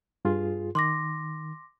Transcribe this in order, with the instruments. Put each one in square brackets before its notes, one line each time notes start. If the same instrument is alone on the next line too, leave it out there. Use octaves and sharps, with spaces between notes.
[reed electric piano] G2 F4 G#4
[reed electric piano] D#3 [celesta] C6 D6 A#6